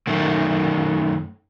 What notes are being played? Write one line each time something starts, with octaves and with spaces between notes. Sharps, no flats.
F#2 D#3 A3